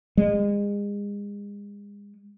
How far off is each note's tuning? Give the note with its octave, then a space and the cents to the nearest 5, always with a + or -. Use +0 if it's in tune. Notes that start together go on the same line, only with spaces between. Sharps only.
G#3 -35